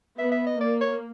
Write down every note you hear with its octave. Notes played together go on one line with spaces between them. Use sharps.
B3 E5
E5
D#5
A#3 D5
C#5